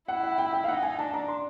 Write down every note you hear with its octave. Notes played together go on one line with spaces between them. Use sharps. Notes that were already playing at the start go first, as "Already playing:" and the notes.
E4 F#5
F#5
G5
G5
F5
D#4 F#5
G#5
D4 A5
A#5
C6